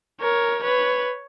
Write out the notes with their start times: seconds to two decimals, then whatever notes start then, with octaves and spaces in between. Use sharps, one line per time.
0.21 A#4 C#5
0.63 B4 C#5